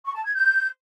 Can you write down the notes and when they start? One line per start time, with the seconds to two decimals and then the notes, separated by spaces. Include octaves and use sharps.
0.05 C#6
0.15 A5
0.25 G#6
0.35 G6